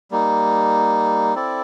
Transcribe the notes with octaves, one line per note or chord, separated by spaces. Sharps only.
G3 A#3 D#4
C4 E4 A4 D5